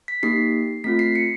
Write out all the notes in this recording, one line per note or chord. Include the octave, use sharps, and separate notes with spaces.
B6
A#3 D#4 G4 C7
A3 C4 F4 B6
C7
C#7